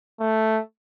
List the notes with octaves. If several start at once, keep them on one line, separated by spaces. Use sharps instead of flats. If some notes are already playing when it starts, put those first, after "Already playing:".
A3